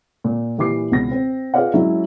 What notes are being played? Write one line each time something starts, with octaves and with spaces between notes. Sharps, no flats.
A#2
A#2 E3 G3 D6 C7
C#2 B2 E3 A#6
C4
F4 G#4 B4 D5 F5 F#5
F#3 G#3 C#4 E4